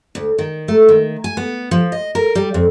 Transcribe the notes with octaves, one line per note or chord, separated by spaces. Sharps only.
D2
D#3
A3
D#3
G#5
B3
F3
D#5
A#4
G3
F2